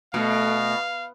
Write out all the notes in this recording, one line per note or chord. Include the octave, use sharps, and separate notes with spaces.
B2 A3 F5